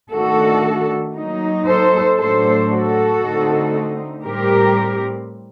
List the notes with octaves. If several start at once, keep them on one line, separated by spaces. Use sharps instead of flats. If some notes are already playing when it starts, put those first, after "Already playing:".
D#3 A3 D4 F#4 A4
F#3 A#3 D#4
A4 C5
A2 F#3 A3 D4 A4 C5
F#4 A4
D3 A3 C4 D#4
A2 G3 C4 G4 A#4